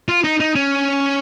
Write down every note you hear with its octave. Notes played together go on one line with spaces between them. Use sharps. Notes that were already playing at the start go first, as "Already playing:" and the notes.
F4
D#4
D#4
C#4